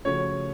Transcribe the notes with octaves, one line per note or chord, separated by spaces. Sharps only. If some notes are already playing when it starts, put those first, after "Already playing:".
C#3 F3 A3 C#4 F#4 C#5